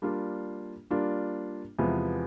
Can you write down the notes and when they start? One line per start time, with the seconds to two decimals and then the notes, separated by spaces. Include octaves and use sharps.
0.02 G3 A#3 D4 F4
0.90 G3 A#3 D4 F4
1.78 E2 C3 F3 G#3 B3